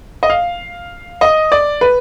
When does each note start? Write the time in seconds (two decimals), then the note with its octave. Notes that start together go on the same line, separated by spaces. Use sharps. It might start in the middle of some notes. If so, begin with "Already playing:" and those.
0.23 D#5
0.30 F5
1.21 D#5
1.52 D5
1.81 B4